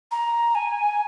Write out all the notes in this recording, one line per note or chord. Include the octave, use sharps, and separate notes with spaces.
A#5
G#5